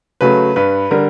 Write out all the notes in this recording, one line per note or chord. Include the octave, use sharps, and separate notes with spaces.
C#3 F#3 A3 B4
G2 B4
D3 G3 A#4